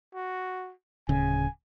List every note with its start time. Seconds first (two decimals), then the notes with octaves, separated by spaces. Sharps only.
0.15 F#4
1.09 D1 C#3 G#5